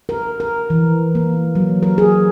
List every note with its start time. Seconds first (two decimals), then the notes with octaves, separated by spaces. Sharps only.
0.09 A#4
0.40 A#4
0.70 E3
1.15 A#3
1.55 F#3
1.83 A#4
1.98 G#4